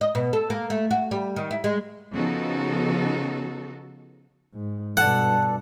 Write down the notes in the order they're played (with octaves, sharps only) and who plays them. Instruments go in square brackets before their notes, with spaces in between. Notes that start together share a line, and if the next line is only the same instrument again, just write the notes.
[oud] D#5
B2
A4
A#3
A3
F#4
G3
D#3
E4
G#3
[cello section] C#3 F3 B3 D#4 F#4 A4
[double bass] G#2
[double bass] G2 B2 [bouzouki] A4 D5 [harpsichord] F#5